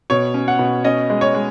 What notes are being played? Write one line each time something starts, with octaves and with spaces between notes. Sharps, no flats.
B2 C#5
C#4
F#5
B2
C#4 D#5
G#3
C#5
G#3